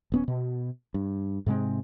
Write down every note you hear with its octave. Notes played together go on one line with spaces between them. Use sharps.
D#1 B3 C#4
B2
G2
G#2 C3 G#3 C4